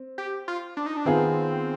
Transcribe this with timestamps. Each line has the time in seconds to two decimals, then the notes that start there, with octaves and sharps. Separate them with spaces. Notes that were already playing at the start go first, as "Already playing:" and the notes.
Already playing: C4
0.18 G4
0.48 F4
0.77 D4
0.86 D#4
0.97 D4
1.05 D#3 B3 C4 F4 G#4